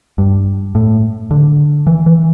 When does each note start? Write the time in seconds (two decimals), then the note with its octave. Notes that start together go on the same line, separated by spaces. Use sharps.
0.18 G2
0.75 A2
1.31 D3
1.87 E3
2.06 E3